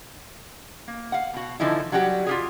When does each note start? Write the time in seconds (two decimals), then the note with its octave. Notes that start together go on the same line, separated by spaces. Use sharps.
0.88 A#3
1.12 F5 F#5
1.33 B2 F#4
1.60 D3 E3 F3 D#4 E4
1.92 F#3 G3 F#4 G4
2.26 F4 G4 G#4